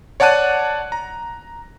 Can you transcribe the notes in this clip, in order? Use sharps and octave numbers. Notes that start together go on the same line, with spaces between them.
C#5 D5 F#5 A5 F#6 D#7
A#5